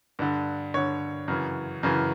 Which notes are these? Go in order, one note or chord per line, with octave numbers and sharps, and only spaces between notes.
G2 D3
G2 D3 C#5
F#2 C#3 E3
F#2 C#3 E3